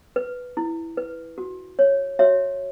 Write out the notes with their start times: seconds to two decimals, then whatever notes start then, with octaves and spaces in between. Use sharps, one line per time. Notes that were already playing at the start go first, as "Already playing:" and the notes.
0.16 B4
0.57 E4
0.97 B4
1.38 F#4
1.79 C#5
2.19 F#4 C#5 E5